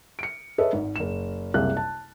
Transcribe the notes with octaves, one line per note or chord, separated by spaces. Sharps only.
C#7 D7
G#4 A4 B4 C#5 D#5 E5
G#1 G#2
F#1 E7
F#1 C2 C3 G#4 F5 F#6
A5